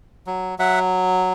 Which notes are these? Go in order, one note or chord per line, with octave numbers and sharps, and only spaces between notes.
F#3
F#3 E5 F#5